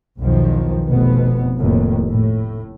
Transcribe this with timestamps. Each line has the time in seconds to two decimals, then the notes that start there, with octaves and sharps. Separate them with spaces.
0.18 B1 E2 D#3 F3
0.87 F1 B2 B3
1.57 F1 D#2 A2
2.07 A2